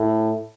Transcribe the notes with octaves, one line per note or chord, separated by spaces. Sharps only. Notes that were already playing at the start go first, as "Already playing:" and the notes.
Already playing: A2